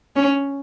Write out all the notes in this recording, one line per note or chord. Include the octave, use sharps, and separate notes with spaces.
C#4